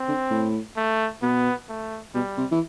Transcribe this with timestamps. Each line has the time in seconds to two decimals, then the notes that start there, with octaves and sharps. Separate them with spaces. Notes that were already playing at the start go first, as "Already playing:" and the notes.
Already playing: C4
0.08 D3
0.31 A2
0.77 A3
1.22 B2 B3
1.69 A3
2.14 B2 G3
2.37 C3
2.51 E3